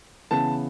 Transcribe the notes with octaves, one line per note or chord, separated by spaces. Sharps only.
C#3 E3 B3 A5